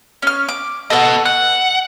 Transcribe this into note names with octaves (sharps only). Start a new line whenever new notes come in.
C#4 F6
D6
A4 B4 D#5 F#5
F#5 F#6